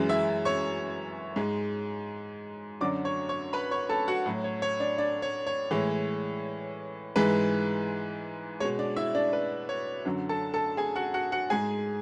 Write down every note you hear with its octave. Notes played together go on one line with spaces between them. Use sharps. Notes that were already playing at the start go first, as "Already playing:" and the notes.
Already playing: F#2 E3 G#3
E4 E5
C#5 C#6
G#2 G#3
F#2 D3 F#3 D5 D6
C#5 C#6
C#5 C#6
B4 B5
C#5 C#6
A4 A5
F#4 F#5
A2 F#3
C#5
C#5
D4 D5
D4 D5
C#5
C#5
A2 E3 G#3
G#2 E3 G#3 B4
B2 G#3 C#5
D4 D5
E4 E5
D4 D5
B4
C#5
F#2 D3 F#3
A4 A5
A4 A5
G#4 G#5
F#4 F#5
F#4 F#5
F#4 F#5
G#2 G#3 G#4 G#5